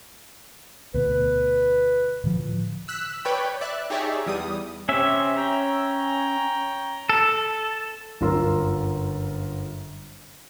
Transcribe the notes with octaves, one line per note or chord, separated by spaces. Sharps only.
D2 B2 B4
A2 D3 F3
E6 F#6 B6
B4 C#5 D5 G5 B5
D5 E5 F#6
D#4 G4 G#4 C#5 D5 E5
E2 G3 D#6
C3 C4 C#4 E5
C#5 G5 A#5
A4
G1 F#2 F4 A#4 C6 E6